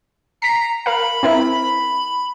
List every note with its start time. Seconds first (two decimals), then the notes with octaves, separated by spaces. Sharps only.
0.42 A#5 B6 C7
0.86 A#4 F5 B5
1.23 C4 E4 A#4